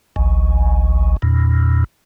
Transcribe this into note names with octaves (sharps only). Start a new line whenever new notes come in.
G#1 C#2
E2 A#2